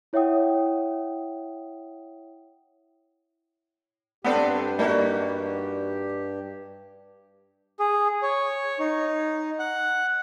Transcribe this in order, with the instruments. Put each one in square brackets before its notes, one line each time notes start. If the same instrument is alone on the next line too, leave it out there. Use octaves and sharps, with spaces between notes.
[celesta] E4 C#5 E5 F#5 G5 D#6
[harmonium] G2 G4 [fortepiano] B3 C4 D4 [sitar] A4 B4 C5
[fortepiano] G3 A#3 [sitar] D#4 F#4
[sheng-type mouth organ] G#4
C#5
D#4
F#5